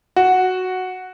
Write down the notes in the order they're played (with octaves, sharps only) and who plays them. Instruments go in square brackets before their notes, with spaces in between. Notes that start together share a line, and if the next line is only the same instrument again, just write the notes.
[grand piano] F#4